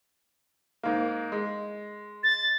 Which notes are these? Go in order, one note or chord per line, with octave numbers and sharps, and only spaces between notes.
G#2 A#3
G#3
A6